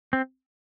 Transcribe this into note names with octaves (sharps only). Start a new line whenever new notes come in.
C4